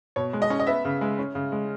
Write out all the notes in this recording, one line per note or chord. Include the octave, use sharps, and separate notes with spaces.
B2 C#5
G#3
D#5
C#4
D#5
B3 E5
C#3
G#3
C#4
C#3
G#3